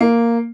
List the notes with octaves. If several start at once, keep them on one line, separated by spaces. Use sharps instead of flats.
A#3